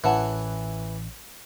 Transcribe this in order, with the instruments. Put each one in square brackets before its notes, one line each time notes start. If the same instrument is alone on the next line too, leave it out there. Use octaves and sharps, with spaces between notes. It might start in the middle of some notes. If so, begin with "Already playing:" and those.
[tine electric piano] A1 [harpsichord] E3 [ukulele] C#5 F#5 A5